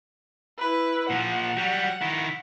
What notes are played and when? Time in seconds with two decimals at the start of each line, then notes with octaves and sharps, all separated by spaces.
0.59 E4 B4
1.10 A#2 F3 F#5
1.57 F#3 G3
2.02 D#3 E4